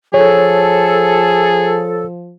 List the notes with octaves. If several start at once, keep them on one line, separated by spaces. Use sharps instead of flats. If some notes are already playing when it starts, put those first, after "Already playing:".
F3 G#4 A4 C#5